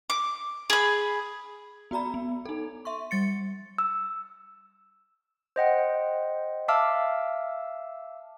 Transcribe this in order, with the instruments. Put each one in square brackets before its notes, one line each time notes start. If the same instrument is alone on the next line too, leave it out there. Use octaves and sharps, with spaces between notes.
[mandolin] D6
G#4 B5
[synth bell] B3 F#4 D5 A#5 B5
B3
D#4 A4
E5 C6 C#6
G3 A6 C#7
[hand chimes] E6
[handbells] C5 D#5 F#5 G5
E5 F5 A5 D6 E6 F6